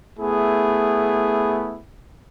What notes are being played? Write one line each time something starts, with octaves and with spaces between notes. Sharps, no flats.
A3 B3 E4 G#4